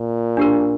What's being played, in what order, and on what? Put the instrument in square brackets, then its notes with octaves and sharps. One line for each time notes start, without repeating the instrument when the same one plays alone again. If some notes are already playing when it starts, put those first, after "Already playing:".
Already playing: [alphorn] A#2
[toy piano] D4 G4 A#4